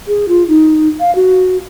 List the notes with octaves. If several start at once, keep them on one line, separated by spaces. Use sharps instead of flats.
G#4
F4
D#4
F5
F#4